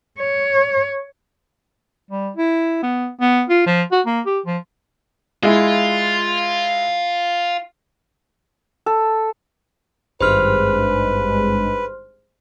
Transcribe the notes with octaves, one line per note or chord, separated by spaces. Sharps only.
C#5
G3
E4
B3
B3
F4
F3
F#4
A#3
G4
F3
G#3 E4 F4
A4
G#1 G2 G#3 B4 C5 C6 F6